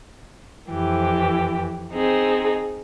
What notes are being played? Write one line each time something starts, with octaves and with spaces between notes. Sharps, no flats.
F2 E3 G4
C4 D#4 G#4